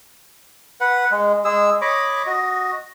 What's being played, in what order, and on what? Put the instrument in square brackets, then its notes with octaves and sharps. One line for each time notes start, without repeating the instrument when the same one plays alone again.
[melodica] B4 F#5
G#3
G#3 G#4 E6
C#5 D#5 B5 D6
F#4 D#5